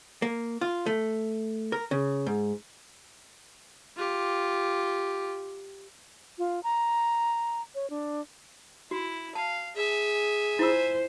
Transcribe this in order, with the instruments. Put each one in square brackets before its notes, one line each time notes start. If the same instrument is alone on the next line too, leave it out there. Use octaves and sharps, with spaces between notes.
[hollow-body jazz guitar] A#3
F4
A3
A#4
C#3
G#2
[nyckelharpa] F4 G4
[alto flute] F4
A#5
C#5
D4
[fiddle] E4 [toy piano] F#4
[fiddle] F5 [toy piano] A5
[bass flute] G#4 [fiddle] E5 G#5
[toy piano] E4 F4 E6 [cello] C5